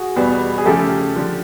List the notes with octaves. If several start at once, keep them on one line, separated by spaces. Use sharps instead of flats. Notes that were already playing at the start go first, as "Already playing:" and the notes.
Already playing: F#4 G#4
E2 B2 G3 B3
G#4
C#3 F3 A3 G4 A4
D3 F3